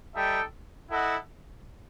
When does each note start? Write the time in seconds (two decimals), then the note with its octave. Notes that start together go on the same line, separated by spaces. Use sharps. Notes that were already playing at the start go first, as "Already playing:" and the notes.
0.14 G3 D#4 A4 E5 G5
0.89 E4 A4 D#5 F#5